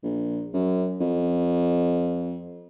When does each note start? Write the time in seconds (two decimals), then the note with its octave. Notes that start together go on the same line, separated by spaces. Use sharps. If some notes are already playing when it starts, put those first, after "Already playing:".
0.04 A#1
0.54 F#2
1.00 F2